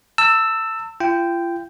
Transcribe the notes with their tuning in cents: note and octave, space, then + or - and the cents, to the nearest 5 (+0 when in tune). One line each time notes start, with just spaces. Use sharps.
A5 +35 E6 +0
F4 -40 G5 +0